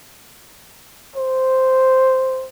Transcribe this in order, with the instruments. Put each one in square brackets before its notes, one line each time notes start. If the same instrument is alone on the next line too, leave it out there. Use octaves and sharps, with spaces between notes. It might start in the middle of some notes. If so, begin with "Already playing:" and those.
[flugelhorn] C5